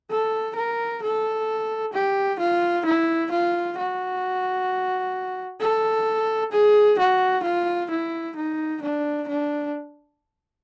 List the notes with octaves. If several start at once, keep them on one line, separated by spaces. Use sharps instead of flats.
A4
A#4
A4
G4
F4
E4
F4
F#4
A4
G#4
F#4
F4
E4
D#4
D4
D4